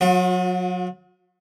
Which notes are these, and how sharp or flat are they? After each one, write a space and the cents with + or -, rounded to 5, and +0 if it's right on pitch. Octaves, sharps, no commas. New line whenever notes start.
F#3 -25 F4 +45